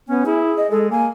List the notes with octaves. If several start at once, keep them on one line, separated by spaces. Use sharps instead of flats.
B3 C#4 G#5
E4 G#4
D#5
G#3 A4
A#3 G#5